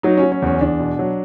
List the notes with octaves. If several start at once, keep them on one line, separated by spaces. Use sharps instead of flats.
F#3 D#4
C#4
F#3
C#4
E2 C#4
E2 D4
B2
F#3